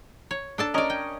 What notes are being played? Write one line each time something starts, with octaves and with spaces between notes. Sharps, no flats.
C#5
D4 A4 A5
C#4 A#4 D5 D#5
G5